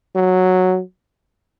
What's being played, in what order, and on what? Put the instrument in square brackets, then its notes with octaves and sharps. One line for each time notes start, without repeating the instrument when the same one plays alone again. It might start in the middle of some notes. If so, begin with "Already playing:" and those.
[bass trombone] F#3